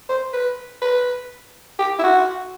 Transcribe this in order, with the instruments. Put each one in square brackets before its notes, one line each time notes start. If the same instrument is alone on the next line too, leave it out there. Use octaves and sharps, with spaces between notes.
[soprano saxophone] C5
B4
B4
G4
E4
F#4